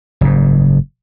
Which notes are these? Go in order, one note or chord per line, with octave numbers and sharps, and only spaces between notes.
F#1 G#2